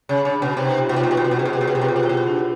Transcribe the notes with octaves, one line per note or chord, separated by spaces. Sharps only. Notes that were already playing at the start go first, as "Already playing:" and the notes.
C#3
C#3 D4
B2
C3 D#4
F4
B2
C3
F4
B2
C3
B2
F#4
C3
B2
C3 G#4
G4
B2
C3
B2
G4
C3
B2
C3
F4
B2
C3
B2
E4
C3
B2
D4